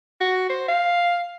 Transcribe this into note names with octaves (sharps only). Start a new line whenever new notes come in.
F#4
C5
F5